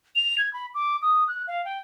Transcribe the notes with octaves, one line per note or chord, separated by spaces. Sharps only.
F7
G#6
B5
D6
D#6
F#6
F5
G5